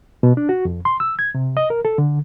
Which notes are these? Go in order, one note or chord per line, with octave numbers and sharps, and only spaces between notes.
B2
D4
F#4
F2
C6
E6
G#6
C3
D#5
A#4
A4
D3